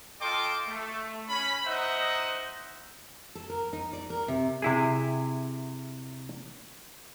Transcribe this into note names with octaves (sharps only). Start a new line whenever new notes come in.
F4 A4 D#5 G5 C6 D6
A3
C#4 B5
D#4 C5 D#5 E5 F#5
A4
A#4
D#4
D5
A#4
C3
C3 E4 G#4